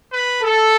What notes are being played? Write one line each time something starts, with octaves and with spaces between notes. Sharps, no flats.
B4
A4